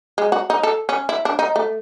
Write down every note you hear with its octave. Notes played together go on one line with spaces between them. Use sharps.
G#3
F#4
D#4
A4
C#4
E4
D4
D#4
A3